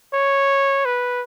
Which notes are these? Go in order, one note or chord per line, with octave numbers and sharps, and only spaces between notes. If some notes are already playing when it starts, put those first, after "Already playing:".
C#5
B4